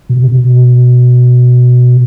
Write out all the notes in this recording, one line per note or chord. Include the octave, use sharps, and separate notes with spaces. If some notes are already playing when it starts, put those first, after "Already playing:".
B2
C3
B2